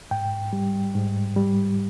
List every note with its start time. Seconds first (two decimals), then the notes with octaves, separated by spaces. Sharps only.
0.11 G#2 G5
0.53 G3
0.95 G#2
1.36 G3